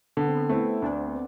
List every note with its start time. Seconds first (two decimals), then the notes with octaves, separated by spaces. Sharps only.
0.17 D3 B3
0.26 C4
0.34 B3
0.49 A3 C4 E4
0.81 D2 D4